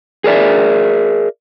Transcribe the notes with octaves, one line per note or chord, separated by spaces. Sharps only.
G#4 A#4 D5 E5